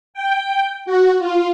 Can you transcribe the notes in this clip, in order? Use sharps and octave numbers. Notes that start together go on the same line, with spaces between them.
G5
F#4
F4